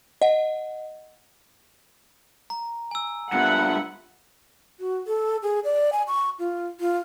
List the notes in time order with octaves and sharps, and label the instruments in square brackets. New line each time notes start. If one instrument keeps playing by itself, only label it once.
[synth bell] D#5 F#5
[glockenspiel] A#5
G#5 E6
[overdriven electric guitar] G2 A#2 [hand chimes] B3 F#6 C#7 [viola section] E5 F#5 B5
[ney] F#4
A4
G#4
D5
G#5
C#6
F4
F4